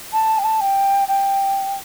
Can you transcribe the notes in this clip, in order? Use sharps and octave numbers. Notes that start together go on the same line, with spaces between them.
A5
G5
A5
G5
G5